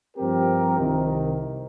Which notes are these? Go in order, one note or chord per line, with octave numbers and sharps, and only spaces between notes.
G2 F3 C4 G4 A#4
C2 C3 D#3